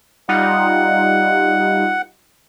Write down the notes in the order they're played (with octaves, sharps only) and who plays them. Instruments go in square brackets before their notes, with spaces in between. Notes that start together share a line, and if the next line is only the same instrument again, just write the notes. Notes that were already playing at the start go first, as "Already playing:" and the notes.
[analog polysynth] G3 D#4 F4 [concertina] F#5